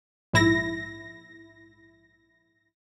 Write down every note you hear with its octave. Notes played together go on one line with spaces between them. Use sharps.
A#1 G#2 E4 A#6